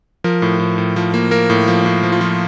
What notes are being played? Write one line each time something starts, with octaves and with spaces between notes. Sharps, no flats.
F3 A#4
A2
A2
A2
F3
A#3
A#3 A#4
A2
F3
A2
F3
F4
F3